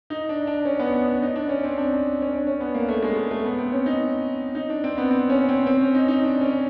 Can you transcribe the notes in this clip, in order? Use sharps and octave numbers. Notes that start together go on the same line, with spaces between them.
D#4
D4
D4
C#4
B3
B3
D4
D#4
D4
C#4
C4
D4
C#4
D4
C#4
B3
A#3
A3
G#3
G#3
A3
B3
C4
C#4
D#4
D#4
D4
C4
B3
C4
C#4
C4
C4
C#4
D#4
D#4
D4
C#4